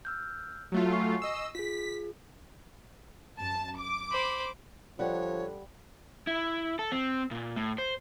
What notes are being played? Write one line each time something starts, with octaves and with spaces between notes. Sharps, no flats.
E6 F6 G6
F#3 A3 F4 F#4
G#5 C#6 C7
D#5 E6
F4 G#4 B6
F#2 A5
D6
C5 B5
D3 F3 G3 C#5 F#5
E4
A4
C4
A#2
A2
C5